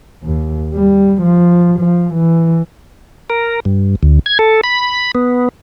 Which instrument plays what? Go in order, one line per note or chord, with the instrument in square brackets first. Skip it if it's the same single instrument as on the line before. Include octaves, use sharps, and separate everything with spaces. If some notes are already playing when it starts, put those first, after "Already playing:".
[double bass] D#2
G3
F3
F3
E3
[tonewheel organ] A#4
G2
D2
G#6
A4
B5
B3